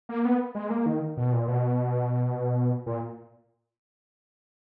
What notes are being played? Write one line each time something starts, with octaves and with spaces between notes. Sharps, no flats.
A#3
B3
G#3
A#3
D#3
B2
A#2
B2
A#2